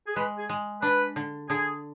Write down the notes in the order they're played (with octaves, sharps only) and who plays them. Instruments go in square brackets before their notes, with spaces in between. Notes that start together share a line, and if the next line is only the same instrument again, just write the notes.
[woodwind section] G#4
[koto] G#3 [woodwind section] B4
[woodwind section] G#4
[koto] G#3
[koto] D4 [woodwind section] B4
[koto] D3
[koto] D3 [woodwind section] G#4